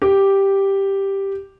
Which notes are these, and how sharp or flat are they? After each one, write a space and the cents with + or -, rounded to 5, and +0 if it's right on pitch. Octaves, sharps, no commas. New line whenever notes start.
G4 +0